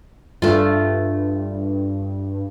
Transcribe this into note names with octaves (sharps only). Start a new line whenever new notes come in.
G2 A3 F4